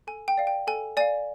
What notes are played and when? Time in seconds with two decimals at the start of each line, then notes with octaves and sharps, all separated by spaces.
0.07 A4 G#5
0.28 G5
0.38 D5 F5
0.47 G5
0.67 A4 G#5
0.97 D5 F5 G#5